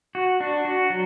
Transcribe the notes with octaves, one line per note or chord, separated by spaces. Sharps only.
F#4
D4
F#4
F#3